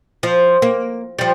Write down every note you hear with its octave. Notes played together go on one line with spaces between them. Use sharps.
F3
A#3
F3 G3